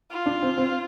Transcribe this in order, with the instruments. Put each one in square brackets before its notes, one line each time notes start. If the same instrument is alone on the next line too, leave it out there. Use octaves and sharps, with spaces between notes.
[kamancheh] F4
[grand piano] D4
C4
C4